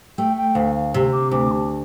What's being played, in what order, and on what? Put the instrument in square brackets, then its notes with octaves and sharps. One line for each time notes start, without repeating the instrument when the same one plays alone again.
[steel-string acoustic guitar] A3 [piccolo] G5
[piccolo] G5
[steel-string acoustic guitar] D2 [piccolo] F5
[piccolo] F5
[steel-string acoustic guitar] C3
[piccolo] D6
[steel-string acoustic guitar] D2 [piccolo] D6
[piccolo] A5